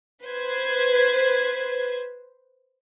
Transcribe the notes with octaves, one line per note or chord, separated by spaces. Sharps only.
B4 C5 G#6